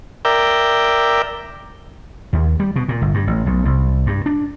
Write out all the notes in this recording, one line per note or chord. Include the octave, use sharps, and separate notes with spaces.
A#4 D5 E5 G5
D#2
G3
B2
A#2
G1
G2
A1
B1
C2
G2
D4